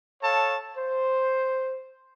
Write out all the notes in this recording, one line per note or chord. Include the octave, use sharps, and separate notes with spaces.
A4 C#5 F5 A5
C5